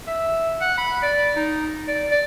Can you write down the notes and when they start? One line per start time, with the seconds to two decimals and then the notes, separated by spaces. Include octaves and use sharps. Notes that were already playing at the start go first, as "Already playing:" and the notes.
0.08 E5
0.61 F#5
0.78 B5
1.03 D5
1.36 D#4
1.88 D5
2.11 D5